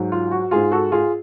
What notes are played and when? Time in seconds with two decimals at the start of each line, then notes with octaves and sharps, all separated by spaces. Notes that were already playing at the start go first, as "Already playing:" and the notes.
Already playing: G#2 F#3
0.12 F4
0.31 F#4
0.51 G#2 G#3 F4 G#4
0.72 F#4 A4
0.92 F4 G#4